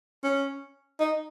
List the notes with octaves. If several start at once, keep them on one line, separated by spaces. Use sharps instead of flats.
C#4
D#4